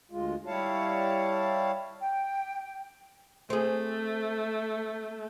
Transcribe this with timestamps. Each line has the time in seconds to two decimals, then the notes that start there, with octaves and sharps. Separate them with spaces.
0.11 D2 G#3 F4
0.47 G3 E4 C#5 F5 A5
2.01 G5
3.50 A3 C4 G#4